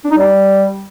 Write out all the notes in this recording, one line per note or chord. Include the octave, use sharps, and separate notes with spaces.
D4
D#4
G3